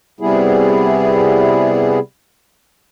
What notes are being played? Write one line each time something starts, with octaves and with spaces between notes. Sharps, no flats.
C3 G3 B3 E4 G#4